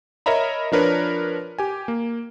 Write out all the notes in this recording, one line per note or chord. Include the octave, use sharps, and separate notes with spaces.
A#4 C#5 D#5 E5 A#5 B5
F3 D4 A#4 B4 C#5
G4 G#5
A#3